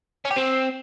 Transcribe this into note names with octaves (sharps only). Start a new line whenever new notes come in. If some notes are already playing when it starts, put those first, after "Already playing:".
C#4
G4
C4